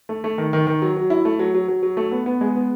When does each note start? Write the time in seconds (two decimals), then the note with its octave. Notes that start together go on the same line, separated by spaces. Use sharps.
0.09 A3
0.24 A3
0.38 D#3
0.53 D#3
0.67 D#3
0.82 F#3
0.97 F#3
1.10 E4
1.25 A3
1.39 F#3
1.54 F#3
1.68 F#3
1.83 F#3
1.97 A3
2.11 B3
2.26 B3
2.41 G#3
2.55 B3